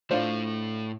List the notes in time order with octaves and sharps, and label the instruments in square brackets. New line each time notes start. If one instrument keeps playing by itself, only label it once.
[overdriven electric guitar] A2 A3 [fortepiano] D4 F4 C5